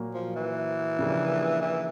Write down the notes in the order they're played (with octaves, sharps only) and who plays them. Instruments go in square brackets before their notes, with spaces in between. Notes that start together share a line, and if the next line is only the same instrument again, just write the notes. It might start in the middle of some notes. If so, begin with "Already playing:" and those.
Already playing: [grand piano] A#2 F#3 A#3
[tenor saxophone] F3
E3
[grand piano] C#3 F3 A#3 D4 G4
[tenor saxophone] E3